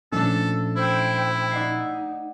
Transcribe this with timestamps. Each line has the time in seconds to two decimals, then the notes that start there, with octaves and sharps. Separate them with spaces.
0.12 A#2 F3 A3 C#4 D4 A4
0.76 E4 C5 G5
1.51 D#4 D5 F#5 C7